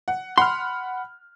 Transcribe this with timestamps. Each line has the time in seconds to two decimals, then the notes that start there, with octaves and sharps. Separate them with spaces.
0.08 F#5
0.38 F#5 B5 C6 F6